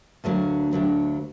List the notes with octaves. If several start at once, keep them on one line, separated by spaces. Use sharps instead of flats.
D2 D3 F#3 A#3
D2 D3 F#3 A#3